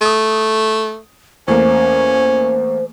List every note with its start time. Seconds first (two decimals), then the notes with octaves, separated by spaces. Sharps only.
0.01 A3 D#6 D#7
1.48 E2 A3 A#3 C#4 C5